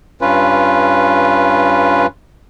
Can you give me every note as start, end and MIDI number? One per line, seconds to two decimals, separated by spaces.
0.21 2.06 43
0.21 2.06 61
0.21 2.06 65
0.21 2.06 71